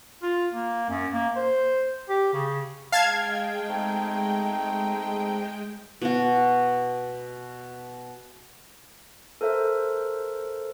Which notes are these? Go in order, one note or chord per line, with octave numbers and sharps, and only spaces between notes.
F4
A#3
F#2
A#3
C5
G4
C#3
G#3 F5 G5 A5 G#6
A3 C4 D#4
B2 F#4
A4 A#4 C5 E5